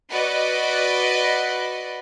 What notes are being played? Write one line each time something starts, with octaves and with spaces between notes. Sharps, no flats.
F#4 B4 D5 D#5